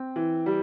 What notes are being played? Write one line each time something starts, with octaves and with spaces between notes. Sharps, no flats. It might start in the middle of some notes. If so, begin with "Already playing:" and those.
Already playing: C4
E3
G3